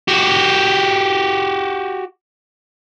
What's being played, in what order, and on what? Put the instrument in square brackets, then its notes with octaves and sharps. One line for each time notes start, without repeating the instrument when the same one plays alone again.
[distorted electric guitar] F#4 G4